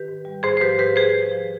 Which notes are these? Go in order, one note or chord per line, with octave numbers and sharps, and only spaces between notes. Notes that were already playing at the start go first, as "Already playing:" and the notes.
Already playing: D#3 G4 B4
G#2
G3
G#2 G#4 C5
C5
F3 G4 B4
F3 G4 B4
G#2 G#4 C5
G#2
F3